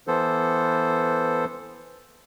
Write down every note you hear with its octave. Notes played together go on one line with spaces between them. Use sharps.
E3 B3 A4 C5